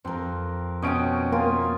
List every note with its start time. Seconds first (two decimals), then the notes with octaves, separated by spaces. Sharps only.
0.05 F2 C4 A#4
0.82 B2 C#4 D#5 E5 G5 D7
1.32 A#3 F4 G#5